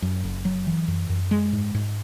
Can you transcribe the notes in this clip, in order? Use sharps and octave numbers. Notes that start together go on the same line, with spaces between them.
F#2
F#1
F#3
E3
F#2
F#2
G#3
G#2
G#2